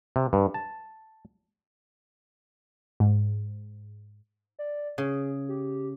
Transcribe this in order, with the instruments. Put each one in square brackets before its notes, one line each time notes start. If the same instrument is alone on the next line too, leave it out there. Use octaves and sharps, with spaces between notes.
[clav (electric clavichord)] C3
G2
A5
[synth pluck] G#2
[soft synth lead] D5
[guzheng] C#3 [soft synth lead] G#4
[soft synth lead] G4